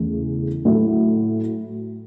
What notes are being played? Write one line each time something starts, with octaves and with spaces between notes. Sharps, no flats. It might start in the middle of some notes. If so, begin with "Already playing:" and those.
Already playing: E2 C#3 E3 A3
A2 F#3 A3 E4